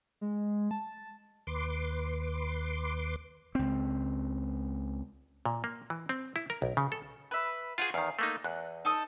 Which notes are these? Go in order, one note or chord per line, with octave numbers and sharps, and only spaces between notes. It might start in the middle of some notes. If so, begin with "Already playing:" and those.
G#3
A5
D#2 B4 C6 D6
C#2 C4
A#2
A#3
E3
C4
E4
A#4
B1
C#3
A4
B4 E5
F4 F#4 G#4 C5
E2 D#3 F5
A3 A#3 D#4
E2 F#6
D#4 A4 D#6